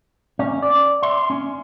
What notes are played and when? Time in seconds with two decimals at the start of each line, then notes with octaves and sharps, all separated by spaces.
0.39 C#4
0.62 D5
1.03 E5 C6
1.30 C#4